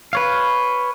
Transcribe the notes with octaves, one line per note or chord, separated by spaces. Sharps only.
B4 C#5 F5